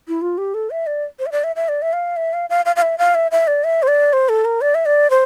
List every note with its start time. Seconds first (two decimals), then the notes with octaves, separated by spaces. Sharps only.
0.08 E4
0.22 F4
0.38 G4
0.54 A4
0.71 E5
0.87 D5
1.19 C5
1.26 E5
1.32 D5
1.44 E5
1.56 E5
1.69 D5
1.82 E5
1.93 F5
2.17 E5
2.33 F5
2.50 F5
2.66 F5
2.76 F5
2.82 E5
2.98 F5
3.15 E5
3.31 E5
3.47 D5
3.64 E5
3.83 C5
3.88 D5
4.13 C5
4.29 A4
4.45 A#4
4.61 D5
4.75 E5
4.86 D5
5.10 C5